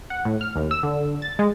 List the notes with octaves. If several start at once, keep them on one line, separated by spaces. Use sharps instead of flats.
F#5
A2
F6
D#2
E6
D3
A6
G#3